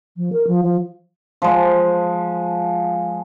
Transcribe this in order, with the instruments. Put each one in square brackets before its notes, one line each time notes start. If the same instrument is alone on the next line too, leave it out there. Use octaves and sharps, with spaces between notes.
[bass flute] F3
A#4
F3
F3
[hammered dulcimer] F3 G#3